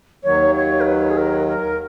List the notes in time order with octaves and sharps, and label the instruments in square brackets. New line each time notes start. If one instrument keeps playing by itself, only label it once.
[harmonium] D#2 D#3 F#3 [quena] C#5
[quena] C#5
A#4
B4
G#4
A#4
A#4